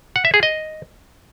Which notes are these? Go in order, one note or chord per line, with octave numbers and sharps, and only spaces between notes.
F#5
E5
G#4
D#5